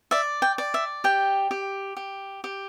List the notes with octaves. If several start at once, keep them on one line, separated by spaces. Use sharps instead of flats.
D5 E5
G5
D5
E5
G4 G5
G4
G4
G4